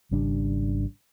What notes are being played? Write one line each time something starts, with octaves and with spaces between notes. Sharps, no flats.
G#1 C#3 G3 D4